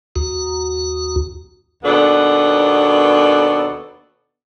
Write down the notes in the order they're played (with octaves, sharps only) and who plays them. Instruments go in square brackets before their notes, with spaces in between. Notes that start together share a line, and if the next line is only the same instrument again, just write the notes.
[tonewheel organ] D#2 F#4
[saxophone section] D#2 B2 B3 D4 A4